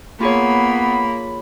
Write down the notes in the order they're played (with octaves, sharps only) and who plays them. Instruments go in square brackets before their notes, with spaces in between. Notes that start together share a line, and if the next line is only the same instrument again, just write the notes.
[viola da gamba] A#3 [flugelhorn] B3 [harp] F4 G#4 C#5 [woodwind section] B5